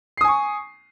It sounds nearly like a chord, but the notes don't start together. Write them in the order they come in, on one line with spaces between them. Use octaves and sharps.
C7 D#6 G#5 C#6